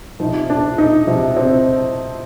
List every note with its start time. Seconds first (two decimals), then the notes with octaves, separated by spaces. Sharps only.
0.20 C3 F3 D#4
0.50 D4
0.78 D#4
1.07 C3 F3
1.37 C4